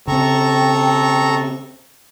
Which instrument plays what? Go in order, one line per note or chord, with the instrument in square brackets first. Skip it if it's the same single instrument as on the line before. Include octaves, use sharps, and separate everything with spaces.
[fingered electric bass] C#3 C4 [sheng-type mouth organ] A4 A#5 C#6 [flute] G5